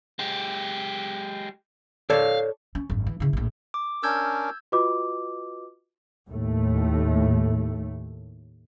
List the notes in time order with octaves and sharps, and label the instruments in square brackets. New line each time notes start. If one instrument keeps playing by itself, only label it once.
[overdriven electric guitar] G#3 G4
[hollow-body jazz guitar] A4 C#5 D5 [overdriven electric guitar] F5
[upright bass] C#4
G#1 F#2
E3
C#3 E4
A#1 A2
[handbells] D6
[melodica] C#4 D4 A#4 [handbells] E6 G6 G#6
[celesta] F4 F#4 B4 D#5 D6
[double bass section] D#2 A2 A3